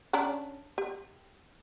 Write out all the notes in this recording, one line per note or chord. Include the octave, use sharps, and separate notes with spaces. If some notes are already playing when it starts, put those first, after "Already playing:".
C#4 D4 A#5
G4